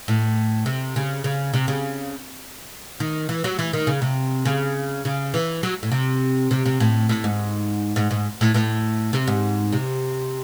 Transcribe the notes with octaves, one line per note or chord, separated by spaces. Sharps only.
A2
C3
C#3
C#3
C3
C#3
D#3
E3
F#3
E3
D#3
C#3
C3
C#3
C#3
E3
F#3
A2
C3
C3
C3
A2
A2
G#2
G#2
G#2
A2
A2
C3
G#2
C3